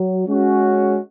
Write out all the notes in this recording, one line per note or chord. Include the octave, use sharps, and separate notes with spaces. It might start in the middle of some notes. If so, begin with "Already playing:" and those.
Already playing: F#3
G#3 C#4 F#4